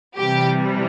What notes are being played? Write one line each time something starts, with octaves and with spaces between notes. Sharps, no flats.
C3 E3 G3 G4